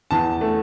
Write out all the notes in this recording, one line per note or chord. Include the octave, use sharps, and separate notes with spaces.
E2 A5
A3